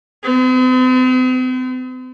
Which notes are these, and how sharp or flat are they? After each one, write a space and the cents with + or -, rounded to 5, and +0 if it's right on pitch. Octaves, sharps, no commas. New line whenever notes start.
C4 -45